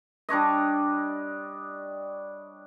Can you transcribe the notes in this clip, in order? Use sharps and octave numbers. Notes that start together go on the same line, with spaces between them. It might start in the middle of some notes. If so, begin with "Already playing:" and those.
G3 D4 C#5 D#5